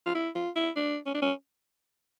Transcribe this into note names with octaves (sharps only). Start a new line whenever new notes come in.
F4
E4
F4
E4
D4
C#4
D4
C#4